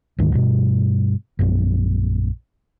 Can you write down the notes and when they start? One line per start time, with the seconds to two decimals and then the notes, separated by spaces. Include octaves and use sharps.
0.19 D2 G#2 D#3
0.34 G2 B2
1.39 A#1 F#2